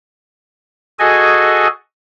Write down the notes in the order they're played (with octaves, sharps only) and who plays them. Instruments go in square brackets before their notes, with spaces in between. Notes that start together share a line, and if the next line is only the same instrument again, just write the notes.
[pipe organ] F#4 G#4 A4 D#5 G#5